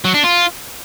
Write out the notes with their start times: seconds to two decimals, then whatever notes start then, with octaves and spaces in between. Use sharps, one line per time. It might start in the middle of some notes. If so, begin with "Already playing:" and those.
0.05 F#3
0.14 D4
0.24 F4